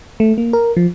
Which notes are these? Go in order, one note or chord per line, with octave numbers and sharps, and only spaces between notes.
A3
A#3
A#4
F3